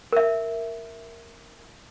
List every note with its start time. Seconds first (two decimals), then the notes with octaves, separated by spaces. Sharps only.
0.12 A#4 E5